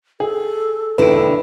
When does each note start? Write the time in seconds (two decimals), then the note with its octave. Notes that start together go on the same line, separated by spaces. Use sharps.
0.20 G#4 A4
0.98 E1 D#2 D3 E4 A4 B4 D7